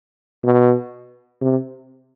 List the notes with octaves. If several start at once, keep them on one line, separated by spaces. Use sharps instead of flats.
B2
C3